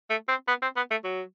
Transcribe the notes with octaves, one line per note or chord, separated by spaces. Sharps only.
A3
C4
B3
C4
B3
A3
F#3